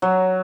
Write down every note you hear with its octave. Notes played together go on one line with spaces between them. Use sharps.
F#3